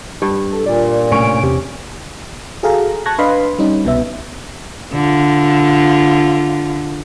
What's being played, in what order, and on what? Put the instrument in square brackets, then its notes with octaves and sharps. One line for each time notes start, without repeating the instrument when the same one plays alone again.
[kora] G2
[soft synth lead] A4
[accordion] A#2 [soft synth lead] D5
[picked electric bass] A2 C3 A3 [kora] C#4 [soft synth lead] D7
[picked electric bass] E2 C3 C4 [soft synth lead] G4
[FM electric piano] F#4 G#4 A4 F5 A#5
A5 C#6 F#6 G#6 A#6
D4 B4 D#5 F5 B5 C6
G3 C#4 D#4
C2 B2 B3 E5
[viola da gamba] D3 F4